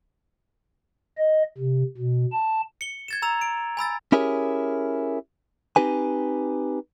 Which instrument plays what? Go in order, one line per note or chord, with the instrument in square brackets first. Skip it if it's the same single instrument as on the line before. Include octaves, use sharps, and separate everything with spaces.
[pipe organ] D#5
C3
B2
A5
[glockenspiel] C#7 G7
G#6 A6 E7
A#5 E6 F7
D7
G#5 B5 E6 A6
[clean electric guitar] C#4 E4 G4 G#4 A#4 C#5
C4 D#4 G4 B4 G#5